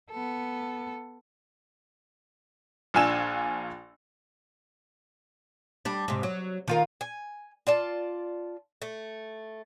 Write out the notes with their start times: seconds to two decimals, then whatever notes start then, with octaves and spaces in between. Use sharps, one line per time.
0.11 B3 A4
2.94 A#1 D4 F4 G#5 E6 E7
5.85 G3 D4
6.08 G#2 C3
6.23 F#3
6.68 D#3 F4 A#4
7.01 G#5
7.67 F4 D5 A5
8.82 A3